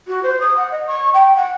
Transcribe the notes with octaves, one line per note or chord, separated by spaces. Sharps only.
F#4
C5
D#6
F#5
D#5
C#6
G5
F#5